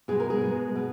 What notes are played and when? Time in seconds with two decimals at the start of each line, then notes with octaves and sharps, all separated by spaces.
0.08 B2 G#3 G#4
0.20 A#4
0.30 G#4
0.41 B2 G#3
0.75 B2